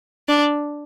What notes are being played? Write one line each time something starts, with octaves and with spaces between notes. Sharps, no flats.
D4